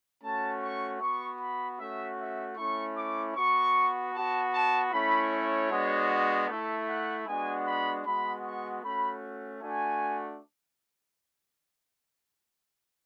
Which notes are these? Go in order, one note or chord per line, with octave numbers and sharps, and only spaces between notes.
A3 C#4 F#4 A5
C#6
B3 F#4 C#6
B5
A3 C#4 F#4 E5
E5
A3 C#4 E4 C#6
D6
B3 F#4 C#6
B3 F#4 A5
A5
A3 C#4 E4 B5
C#5
G#3 B3 D4 F#4
A3 E4 A4
F#5
G#3 B3 D4 F#4 G#5
B5
G#3 B3 F#4 B5
C#6
A3 C#4 F#4 B5
A3 D4 F#4 G#5